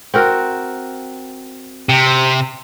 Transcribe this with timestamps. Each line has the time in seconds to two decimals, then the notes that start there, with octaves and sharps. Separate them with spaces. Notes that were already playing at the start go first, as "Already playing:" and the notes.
0.14 C4 F#4 A#4
1.89 C3